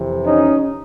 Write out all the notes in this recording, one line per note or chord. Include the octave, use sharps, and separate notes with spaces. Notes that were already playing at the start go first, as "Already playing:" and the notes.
Already playing: F2 C3 E3
C#4 D#4